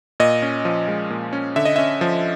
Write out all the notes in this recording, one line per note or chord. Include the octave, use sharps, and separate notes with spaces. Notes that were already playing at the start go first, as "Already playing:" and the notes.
A#2 D#5
C#4
F3
G#3
A#2
C#4
D3 E5
D#5
C#4 E5
F3